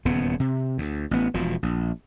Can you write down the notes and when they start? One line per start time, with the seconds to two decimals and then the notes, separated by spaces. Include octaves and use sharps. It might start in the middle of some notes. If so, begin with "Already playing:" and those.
0.05 D#1 E2 C#3 B3
0.40 C3
0.78 D2
1.11 A1 B3
1.34 E1 B2 F3
1.63 A#1